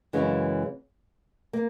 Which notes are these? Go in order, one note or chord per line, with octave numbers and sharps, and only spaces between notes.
F#2 C#3 E3 G#3 C#4
A#3